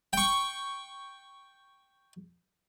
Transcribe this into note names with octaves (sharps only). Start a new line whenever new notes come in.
G5 C#6